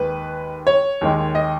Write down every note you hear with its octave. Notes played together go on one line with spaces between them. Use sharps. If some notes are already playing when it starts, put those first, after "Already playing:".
Already playing: D#2 D#3 G#3 B4
C#5
D#2 D#3 G#3
D#5